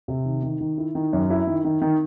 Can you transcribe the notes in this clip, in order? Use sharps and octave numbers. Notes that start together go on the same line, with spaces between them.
C3
D#3
D#3
D#3
E4
D#3
F#2
E4
D#3
D#3
D#3